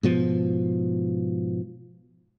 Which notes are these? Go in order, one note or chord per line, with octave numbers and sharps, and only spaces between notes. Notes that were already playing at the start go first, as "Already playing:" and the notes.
G#2 B2 F3